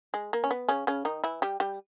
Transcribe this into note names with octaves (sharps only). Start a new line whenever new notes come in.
G#3
A#3
C#4
B3
C#3 C#4
C#3 C#4
D#3 D#4
E3 E4
G3 G4
G3 G4